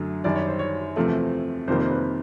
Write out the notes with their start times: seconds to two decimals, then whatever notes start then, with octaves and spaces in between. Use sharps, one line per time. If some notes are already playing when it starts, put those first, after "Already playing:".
Already playing: F#2 D3 F#3 A3
0.24 F#2 D#3 G3 D5
0.36 C#5
0.48 C5
0.59 C#5
0.96 E2 C3 F3 A3
1.68 F2 C3 D#3 G3 A#3 C5
1.81 C5
1.91 B4